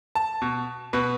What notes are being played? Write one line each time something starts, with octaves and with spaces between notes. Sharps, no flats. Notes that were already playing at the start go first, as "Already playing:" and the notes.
A5
B2
B2 B4